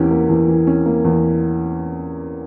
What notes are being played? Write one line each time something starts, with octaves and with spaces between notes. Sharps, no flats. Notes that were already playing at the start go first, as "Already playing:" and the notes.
Already playing: E2 E3 A#3 C#4 G4
A#3
E2
E3
C#4
A#3
E2